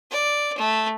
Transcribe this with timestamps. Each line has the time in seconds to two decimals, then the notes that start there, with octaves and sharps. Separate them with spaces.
0.11 D5
0.57 A3